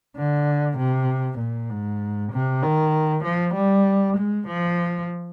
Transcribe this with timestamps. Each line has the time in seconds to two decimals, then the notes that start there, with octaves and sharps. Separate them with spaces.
0.16 D3
0.77 C3
1.39 A#2
1.70 G#2
2.32 C3
2.63 D#3
3.24 F3
3.54 G3
4.17 G#3
4.47 F3